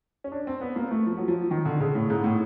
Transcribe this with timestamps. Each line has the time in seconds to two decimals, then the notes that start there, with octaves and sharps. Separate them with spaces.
0.24 C#4
0.32 D4
0.47 C4
0.61 B3
0.76 A#3
0.91 A3
1.06 F3
1.17 F#3
1.28 F3
1.51 D#3
1.65 D3
1.80 C#3
1.95 A2
2.10 G#2
2.24 A2